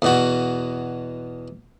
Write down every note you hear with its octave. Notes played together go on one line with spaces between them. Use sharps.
E2 B2 F#4